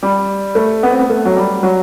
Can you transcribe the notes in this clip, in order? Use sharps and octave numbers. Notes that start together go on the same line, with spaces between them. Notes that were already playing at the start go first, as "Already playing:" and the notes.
G3
A3
B3
C4
B3
A3
F#3
G3
F#3